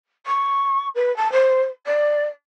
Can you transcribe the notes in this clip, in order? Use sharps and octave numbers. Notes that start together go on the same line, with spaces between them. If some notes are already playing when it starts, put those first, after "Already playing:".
C#6
B4
A5
C5
D5